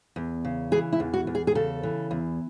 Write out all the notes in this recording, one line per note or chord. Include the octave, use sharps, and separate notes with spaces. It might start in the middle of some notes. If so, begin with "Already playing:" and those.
E2
C#3
E3 G#4
E4
E2
F#4
E2
G#4
G#4
C#3 A4
E3
E2